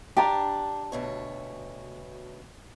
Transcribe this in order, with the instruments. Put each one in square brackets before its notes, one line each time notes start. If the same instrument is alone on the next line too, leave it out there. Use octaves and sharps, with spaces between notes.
[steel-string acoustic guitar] D4 [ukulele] G4 A5 A#5
[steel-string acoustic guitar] D2 B2 C#5